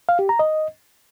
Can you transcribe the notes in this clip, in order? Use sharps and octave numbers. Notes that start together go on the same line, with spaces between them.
F5
G4
A#5
D#5